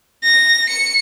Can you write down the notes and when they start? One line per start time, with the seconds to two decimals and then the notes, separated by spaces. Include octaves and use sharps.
0.23 A#6
0.69 C#7